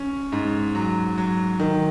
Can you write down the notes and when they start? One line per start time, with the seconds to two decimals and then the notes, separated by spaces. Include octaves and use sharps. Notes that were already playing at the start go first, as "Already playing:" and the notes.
Already playing: C#4
0.32 G#2
0.75 F#3
1.18 F#3
1.60 D#3